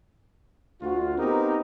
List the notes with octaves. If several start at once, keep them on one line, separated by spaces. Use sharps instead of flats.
D2 F4 F#4
B3 C4 D#4 E4 G4 A#4